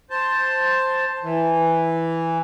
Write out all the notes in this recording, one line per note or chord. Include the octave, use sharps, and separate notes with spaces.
C5 A5
E3